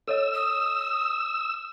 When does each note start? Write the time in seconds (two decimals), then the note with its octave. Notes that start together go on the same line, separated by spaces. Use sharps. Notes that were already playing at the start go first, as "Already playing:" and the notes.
0.08 A4 C#5 D#5 E6
0.34 D#6